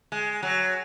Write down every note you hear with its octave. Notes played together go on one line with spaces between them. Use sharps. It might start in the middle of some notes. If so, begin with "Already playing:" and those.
G#3
F#3